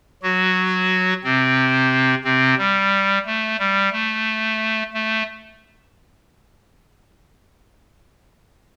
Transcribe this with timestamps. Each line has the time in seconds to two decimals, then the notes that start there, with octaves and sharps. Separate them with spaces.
0.23 F#3 F#4
1.24 C3 C4
2.24 C3 C4
2.58 G3
3.26 A3
3.59 G3
3.92 A3
4.94 A3